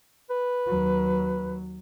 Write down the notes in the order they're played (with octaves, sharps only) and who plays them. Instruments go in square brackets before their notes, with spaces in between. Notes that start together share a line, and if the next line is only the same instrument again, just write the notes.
[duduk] B4
[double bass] D#2 F#3